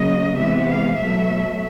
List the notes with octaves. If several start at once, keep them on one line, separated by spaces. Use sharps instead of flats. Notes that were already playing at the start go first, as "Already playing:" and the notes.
Already playing: C#3 F#3 A#3 D#5
C3 E3 G#3 B3 E5
F5
B2 F#3 A3 E5